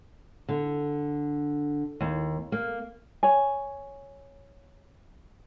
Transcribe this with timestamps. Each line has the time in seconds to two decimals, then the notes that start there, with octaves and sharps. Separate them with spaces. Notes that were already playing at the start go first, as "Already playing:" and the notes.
0.49 D3
2.00 D#2
2.52 A#3
3.23 C#5 G#5